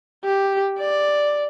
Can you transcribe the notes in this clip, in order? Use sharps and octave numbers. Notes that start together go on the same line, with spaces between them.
G4
D5